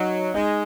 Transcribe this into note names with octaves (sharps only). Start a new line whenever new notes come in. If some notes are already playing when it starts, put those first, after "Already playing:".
Already playing: F#3 D#4
G#3 D#4